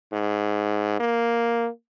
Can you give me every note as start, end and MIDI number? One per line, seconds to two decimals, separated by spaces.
0.13 0.97 44
1.00 1.69 58